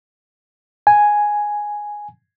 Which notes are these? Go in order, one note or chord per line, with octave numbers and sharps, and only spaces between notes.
G#5